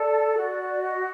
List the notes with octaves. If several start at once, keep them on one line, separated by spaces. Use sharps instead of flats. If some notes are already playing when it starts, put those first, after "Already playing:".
Already playing: A4 D5
F#4
D#5